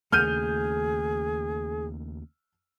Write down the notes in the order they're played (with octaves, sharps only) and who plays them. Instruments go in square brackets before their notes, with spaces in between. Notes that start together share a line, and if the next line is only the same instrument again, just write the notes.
[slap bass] D#2 C#3 A3 [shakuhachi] G#4 [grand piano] F6 G6 D#7